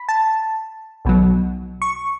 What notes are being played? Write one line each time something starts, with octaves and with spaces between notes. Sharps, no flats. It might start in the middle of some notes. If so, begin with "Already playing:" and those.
Already playing: B5
A5
B1 B2 F#3
C#6